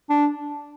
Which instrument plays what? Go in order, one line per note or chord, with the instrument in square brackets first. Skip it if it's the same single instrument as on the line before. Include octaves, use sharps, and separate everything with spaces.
[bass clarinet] D4